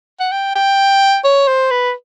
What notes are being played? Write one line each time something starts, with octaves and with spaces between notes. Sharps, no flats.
F#5
G5
G5
C#5
C5
B4